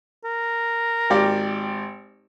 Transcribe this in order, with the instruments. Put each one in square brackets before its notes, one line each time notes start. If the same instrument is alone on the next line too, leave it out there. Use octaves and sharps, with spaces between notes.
[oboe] A#4
[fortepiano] G#1 G4 D5